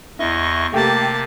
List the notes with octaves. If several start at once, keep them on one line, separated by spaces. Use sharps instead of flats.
E2 E4 D#5 C#6
C3 A3 A#3 G4 G5 A5